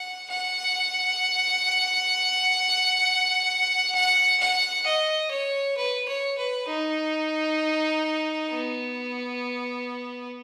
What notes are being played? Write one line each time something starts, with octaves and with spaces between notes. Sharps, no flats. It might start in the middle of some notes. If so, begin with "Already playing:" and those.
Already playing: F#5
F#5
F#5
F#5
D#5
C#5
B4
C#5
B4
D#4
B3